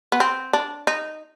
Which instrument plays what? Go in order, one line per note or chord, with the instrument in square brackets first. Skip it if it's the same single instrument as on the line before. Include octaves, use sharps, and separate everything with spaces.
[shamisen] B3
C4
D4
D#4